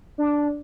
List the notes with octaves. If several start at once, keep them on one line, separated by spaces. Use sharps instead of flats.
D4